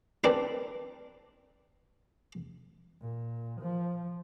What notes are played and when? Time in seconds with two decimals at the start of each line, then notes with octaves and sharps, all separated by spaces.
0.24 C4 D4 A#4 B4
3.01 A#2
3.62 F3